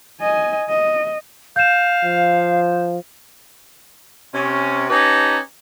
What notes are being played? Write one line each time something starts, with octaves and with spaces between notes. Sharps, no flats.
D#5 G#5
D#5
F5 G6 E7
F3
C3 C#4
C#4 D#4 G4 B4 A5 A#5